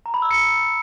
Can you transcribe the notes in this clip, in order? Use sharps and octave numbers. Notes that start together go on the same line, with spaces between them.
A#5
B5
E6
C#7